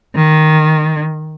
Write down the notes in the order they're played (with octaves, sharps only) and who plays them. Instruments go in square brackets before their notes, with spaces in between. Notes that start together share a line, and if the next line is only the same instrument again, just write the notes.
[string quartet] D#3